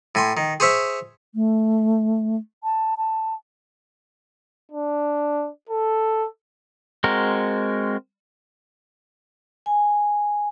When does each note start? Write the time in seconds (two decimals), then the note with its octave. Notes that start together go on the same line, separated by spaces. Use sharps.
0.15 A2 G#5 C6
0.37 D#3
0.60 G#4 C5 C#5 E5
1.35 A3
2.64 A5
2.98 A5
4.72 D4
5.69 A4
7.04 G#3 C4 F#4 A#4
9.66 G#5